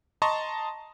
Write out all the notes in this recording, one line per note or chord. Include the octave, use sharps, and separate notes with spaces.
D#5 A5 A#5 C6 C#6